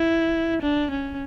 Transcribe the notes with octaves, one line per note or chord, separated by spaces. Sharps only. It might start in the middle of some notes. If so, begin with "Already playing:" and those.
Already playing: E4
D4
C#4